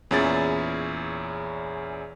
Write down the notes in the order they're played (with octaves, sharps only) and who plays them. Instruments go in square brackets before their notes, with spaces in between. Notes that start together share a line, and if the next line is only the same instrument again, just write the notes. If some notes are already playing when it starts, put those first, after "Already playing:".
[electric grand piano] E2 A#2 C#4 E4 G#4 A6